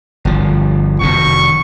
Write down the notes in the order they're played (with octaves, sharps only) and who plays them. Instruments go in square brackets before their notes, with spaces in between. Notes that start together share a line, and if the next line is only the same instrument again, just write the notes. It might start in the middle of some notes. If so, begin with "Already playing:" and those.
[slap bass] G1 F3
[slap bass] F1 B2 D#3 [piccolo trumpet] C#6